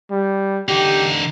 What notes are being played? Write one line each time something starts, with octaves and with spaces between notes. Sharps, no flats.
G3
D3 D#4 G4